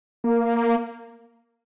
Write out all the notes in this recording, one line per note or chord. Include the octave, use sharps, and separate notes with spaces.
A#3